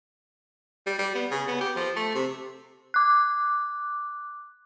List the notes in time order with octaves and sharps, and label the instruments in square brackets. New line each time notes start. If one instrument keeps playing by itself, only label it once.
[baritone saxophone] G3
G3
B3
C#3
B3
G4
F3
A3
C3
[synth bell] D6 F#6